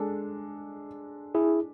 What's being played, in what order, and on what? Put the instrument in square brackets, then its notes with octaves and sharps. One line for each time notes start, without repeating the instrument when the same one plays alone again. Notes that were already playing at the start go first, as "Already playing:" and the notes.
Already playing: [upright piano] G#3 D4 A4
[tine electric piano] E4 G#4